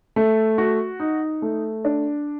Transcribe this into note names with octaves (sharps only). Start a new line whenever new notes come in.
A3
F#4
D#4
A3
D4